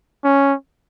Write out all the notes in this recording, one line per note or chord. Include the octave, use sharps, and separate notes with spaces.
C#4